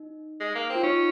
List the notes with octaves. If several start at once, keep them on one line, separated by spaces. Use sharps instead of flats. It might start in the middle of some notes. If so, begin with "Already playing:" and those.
Already playing: D#4
G#3
A#3
C4
F4
C#4 D#4